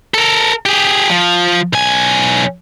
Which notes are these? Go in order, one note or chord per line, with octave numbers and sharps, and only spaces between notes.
A4 A#4
G4 G#4
F3
B1 G#5